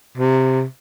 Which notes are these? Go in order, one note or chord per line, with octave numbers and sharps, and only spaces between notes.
C3